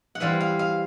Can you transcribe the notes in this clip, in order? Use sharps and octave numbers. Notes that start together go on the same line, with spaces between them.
F#5
E3 G3 C4 F5
F5
F5